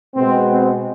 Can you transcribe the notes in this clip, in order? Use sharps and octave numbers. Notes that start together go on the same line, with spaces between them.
B2 G#3 B3 C4
C4